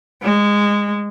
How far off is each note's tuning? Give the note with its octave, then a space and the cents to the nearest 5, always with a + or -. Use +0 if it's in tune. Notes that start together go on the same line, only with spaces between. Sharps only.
G#3 -15